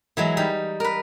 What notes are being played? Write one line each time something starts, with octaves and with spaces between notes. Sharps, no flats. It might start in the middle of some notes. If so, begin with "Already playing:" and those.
E3 F#3 G#3 E4
G3 D#4
A#4 B4